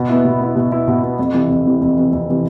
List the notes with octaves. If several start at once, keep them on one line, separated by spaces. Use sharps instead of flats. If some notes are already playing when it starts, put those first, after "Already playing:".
Already playing: B2
B3 E4
B2
B3 E4
B2
B3 E4
B2
B3 E4
F2
C3 E3
F2
C3 E3
F2
C3 E3
F2
C3 E3